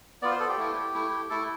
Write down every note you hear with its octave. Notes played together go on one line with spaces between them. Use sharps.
B3 F4 D5
C5
A4
G4
A3 E4
A3 E4
A3 E4 A4